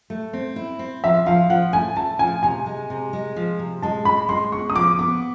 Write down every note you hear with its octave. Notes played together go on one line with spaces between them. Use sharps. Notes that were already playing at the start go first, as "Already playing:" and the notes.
A3
C4
E4
C4
F3 E5
F3 F5
F3 F#5
A3 G#5
A3 A5
F3 G#5
C3 G#5
G#3
C3
G#3
F3
C3
G#3 A5
G#3 B5
G#3 C6
B3 C#6
D#6
F3 D6
B3 D6